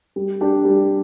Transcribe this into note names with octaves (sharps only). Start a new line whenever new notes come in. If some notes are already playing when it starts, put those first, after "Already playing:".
G3
D4 G4
G3